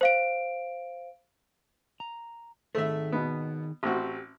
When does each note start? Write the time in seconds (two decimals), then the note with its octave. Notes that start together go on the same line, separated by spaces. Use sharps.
0.01 C5 F5 D7
2.00 A#5
2.75 D#3 A3 G#4 E5
3.12 B2 B3
3.83 A1 C4 F#4 G4